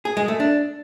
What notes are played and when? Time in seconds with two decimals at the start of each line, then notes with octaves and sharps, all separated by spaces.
0.05 G#4
0.17 G#3
0.28 A3
0.40 D4